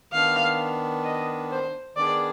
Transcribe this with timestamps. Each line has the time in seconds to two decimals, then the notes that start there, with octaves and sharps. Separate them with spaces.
0.13 D#3 B3 D4 F5
1.04 D#5
1.51 C5
1.96 D#3 B3 D4 G#4 D5